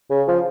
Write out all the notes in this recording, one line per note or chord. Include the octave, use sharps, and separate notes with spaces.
C#3
F3